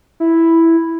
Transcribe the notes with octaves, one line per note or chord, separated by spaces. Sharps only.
E4